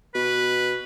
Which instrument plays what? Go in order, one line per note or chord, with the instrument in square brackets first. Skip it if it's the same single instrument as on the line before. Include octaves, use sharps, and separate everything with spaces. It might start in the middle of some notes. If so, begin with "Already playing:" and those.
[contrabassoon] B2 [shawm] B4